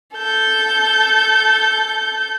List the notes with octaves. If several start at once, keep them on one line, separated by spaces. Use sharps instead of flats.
A4 G6